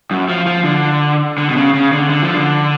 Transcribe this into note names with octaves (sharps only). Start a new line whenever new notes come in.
F#2
F3
F3
D3
D3
B2
C#3
C#3
D3
D3
F3
D3